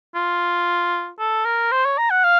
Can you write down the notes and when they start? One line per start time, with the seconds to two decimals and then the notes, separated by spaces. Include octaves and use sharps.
0.15 F4
1.19 A4
1.46 A#4
1.72 C5
1.85 C#5
1.98 A#5
2.11 F#5
2.24 F5